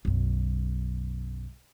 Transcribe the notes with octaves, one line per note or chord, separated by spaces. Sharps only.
B1 F#2